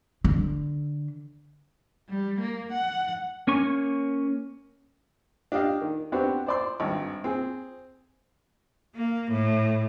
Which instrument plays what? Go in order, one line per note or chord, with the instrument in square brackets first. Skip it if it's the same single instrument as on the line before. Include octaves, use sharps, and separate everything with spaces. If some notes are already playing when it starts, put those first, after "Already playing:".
[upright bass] D3
[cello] G3
A#3
F#5
[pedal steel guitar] A#3 C#4 G#5 C#6
[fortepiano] D4 G4 D#5 F5
D#3
B3 C4 D4 F#4 G4 C5
C5 D5 C6
G#1 G2
C4 G#4
[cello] A#3
A2